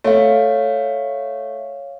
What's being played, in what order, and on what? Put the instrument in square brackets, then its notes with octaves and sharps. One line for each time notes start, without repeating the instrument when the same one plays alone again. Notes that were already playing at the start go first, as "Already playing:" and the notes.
[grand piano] A3 [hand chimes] C#5 F5